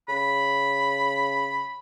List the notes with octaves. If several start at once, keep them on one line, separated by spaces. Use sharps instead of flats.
C#3 B5